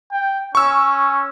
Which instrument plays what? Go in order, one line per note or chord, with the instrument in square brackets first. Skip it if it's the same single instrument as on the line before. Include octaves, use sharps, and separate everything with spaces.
[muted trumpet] G5
[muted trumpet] C#4 [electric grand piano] C#6 E6